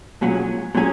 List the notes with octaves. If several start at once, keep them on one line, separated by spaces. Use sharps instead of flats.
B1 A#2 F#3 C#4 G#4
A#2 F#3 C#4 G#4